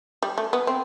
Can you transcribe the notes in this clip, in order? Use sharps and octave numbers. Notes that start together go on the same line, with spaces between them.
G3
A3
B3
C4